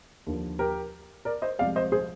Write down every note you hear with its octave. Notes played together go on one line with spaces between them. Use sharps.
D#2 D3 F3
G4 A#4
A#4 D5
C5 D#5
C2 C3 F3 G#3 D5 F5
C5 D#5
G#4 C5